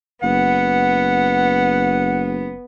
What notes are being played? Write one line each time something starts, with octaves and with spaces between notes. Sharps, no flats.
F#1 B3 F#5